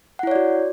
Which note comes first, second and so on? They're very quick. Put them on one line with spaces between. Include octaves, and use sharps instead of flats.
F#5 E4 C#5 D5 F#4